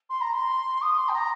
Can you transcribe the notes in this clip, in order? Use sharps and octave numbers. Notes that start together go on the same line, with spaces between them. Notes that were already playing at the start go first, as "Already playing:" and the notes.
C6
A#5
C6
D#6
C6
G5
A#5